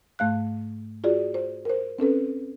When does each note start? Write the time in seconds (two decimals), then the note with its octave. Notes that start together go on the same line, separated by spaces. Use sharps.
0.19 G#2 A3 F5 F#6
1.04 F4 F#4 G#4 D5
1.34 C5
1.65 A#4 C5
1.98 C4 C#4 A4 B4